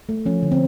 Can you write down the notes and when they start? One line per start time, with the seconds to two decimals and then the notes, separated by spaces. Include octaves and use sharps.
0.09 A3
0.26 F3 C#4
0.43 D3
0.52 C4